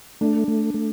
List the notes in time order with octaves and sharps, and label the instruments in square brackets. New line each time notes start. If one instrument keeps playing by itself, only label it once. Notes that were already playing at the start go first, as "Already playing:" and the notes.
[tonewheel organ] A3 [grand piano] D4
[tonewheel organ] A3
A3